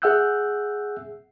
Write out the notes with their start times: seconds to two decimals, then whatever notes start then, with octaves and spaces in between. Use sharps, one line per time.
0.02 G#4 E5 F#5 E6 F#6 G6